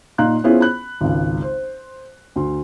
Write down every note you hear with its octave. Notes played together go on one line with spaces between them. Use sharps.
A#2 D#4 F5 A#5 C6 F#6
B3 C#4 E4 F4 G#4 C5
B5 F#6
G#1 C#2
C5
D2 C6